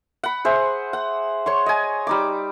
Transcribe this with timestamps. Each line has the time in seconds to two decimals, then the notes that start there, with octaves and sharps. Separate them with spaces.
0.23 F#5 B5
0.45 G#4 C5 E5
0.93 F#5
1.46 C#5 C6 C#6
1.66 D#5 G#5
2.07 G3 D#4 D6